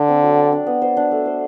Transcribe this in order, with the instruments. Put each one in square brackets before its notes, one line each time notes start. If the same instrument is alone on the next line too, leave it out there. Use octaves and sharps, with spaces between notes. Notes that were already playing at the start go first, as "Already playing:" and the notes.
Already playing: [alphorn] D3 [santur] A4
[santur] C4
F#3
D5
D4
B3
C5
D4
A3
C5